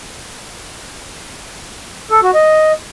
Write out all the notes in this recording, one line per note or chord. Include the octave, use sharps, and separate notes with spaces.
A4
F#4
D#5